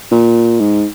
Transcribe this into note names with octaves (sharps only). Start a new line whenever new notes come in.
A#2
G#2